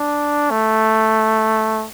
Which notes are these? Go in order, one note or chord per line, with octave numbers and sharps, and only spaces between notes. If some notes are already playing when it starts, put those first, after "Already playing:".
Already playing: D4
A3